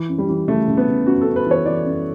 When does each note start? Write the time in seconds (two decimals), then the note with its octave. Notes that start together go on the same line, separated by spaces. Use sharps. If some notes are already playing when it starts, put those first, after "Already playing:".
Already playing: E3
0.09 F#2
0.18 G3
0.28 E3
0.48 C#3 A3
0.68 C#3
0.77 B3
0.87 C#3
1.07 F#2 F#4
1.21 A4
1.26 F#2
1.36 B4
1.46 E3 C#5
1.66 E3 D5
1.85 F#2